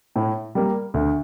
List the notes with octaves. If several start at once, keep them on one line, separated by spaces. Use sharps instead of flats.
A2
G3 A#3
D2